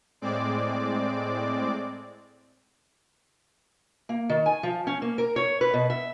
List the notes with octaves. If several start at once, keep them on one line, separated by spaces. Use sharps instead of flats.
A2 G#3 C4 D5 D6
A#3
D#3
G#5
F3
C#4
A#3
A#4
C#5
B4
B2
E5